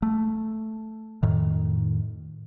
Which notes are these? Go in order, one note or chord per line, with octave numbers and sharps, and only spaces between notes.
A3
F2 A2 D#3